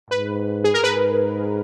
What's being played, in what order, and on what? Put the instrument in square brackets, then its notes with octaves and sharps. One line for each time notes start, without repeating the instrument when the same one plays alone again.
[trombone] G#2 [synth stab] B4
[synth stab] G#4
A#4
[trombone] G#2 [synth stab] B4